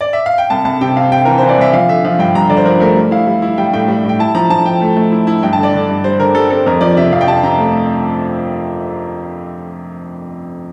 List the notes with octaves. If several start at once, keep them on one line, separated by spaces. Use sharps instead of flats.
D5
E5
F5
G5
C2 A5
C2 A5
C3 G5
C3 F5
C3 G5
E3 A#4
E3 C5
D5
C2 E5
F3 F5
D3 E5
F3 F5
G2 G5
G2 A#5
D3 D5
C5
F3 A#4
A3 A#4
G3
E4 F5
G3
E4
G3 G5
A2 G5
G3
A2 G5
E4 A5
F3 A#5
F3 A5
F3 G5
A3
A3
E4
E4
G2 G5
D3 A5
D5
D3
G2
G3 C5
D3 A#4
G3 A4
C4 A4
F2 A#4
F3 D5
C3 E5
F2 F5
G5
C3 A5
C3 A#5
A3